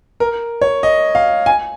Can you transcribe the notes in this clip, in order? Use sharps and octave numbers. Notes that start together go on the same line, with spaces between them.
A#4
C#5
D#5
F5
G#5